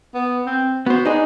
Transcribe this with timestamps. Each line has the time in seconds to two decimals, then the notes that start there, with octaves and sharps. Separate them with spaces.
0.14 B3
0.46 C4
0.86 B3 F#4 C5
1.05 D4 D#4 G#4